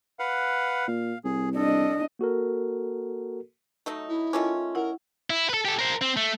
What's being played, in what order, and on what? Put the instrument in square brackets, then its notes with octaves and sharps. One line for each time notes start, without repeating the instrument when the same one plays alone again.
[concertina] B4 F5 F#5
[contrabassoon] A#2 [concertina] F5
[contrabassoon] C2 [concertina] G#4
[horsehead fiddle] D4 D#5 [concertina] A4
[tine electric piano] A#3 F#4 A4 A#4
[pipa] F#3 A3 D#4
[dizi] E4
[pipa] D#3 A3 C#4 [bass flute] F4 [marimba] D6
[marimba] E4 F#5 [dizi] A#4
[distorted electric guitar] E4
A4 B4
G4 A4
A#4 C5
C4
A3